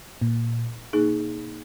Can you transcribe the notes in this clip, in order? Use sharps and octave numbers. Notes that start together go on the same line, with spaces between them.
A#2
B2 A#3 D#4 G#4